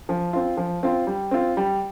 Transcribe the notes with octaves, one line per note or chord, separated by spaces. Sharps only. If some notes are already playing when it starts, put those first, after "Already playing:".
F3
C4 F4
F3
C4 F4
G3
C4 F4
G3